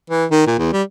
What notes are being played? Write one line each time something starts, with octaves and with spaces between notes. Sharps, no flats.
E3
D#3
A#2
E2
G3